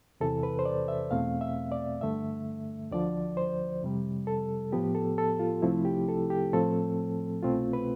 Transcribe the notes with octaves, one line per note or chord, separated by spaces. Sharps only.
E2 C3 E3 A4
B4
C5
D5
E5
E2 B2 A3 C4 F5
E5
D5
G2 D3 A3 E5
D2 D3 F3 D5
C5
F2 C3 G3
A4
A2 F3 B3 G4
A4
A4
F4
C2 C3 F3 A3 C4 E4
G4
A4
G4
A2 F3 A3 C4 A4
C2 B2 A3 C4 F4
B4